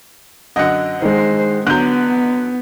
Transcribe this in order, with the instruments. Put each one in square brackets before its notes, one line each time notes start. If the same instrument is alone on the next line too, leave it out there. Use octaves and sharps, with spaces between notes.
[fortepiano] F#2 D3 [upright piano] D#5 F#5
[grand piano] D#3 G#3 [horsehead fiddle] C5
[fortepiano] D3 F#3 [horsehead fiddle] B3 [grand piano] F#6 G6